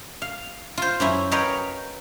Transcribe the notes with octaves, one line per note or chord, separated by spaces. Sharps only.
F5
F4 C5
F#2 C#4 E4
A#4 B4 C#5 D#5 F5 G5